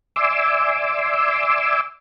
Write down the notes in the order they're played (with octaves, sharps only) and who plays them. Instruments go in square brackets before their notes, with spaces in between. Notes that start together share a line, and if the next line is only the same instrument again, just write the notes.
[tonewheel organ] D5 E5 G#5 C6 D6 E6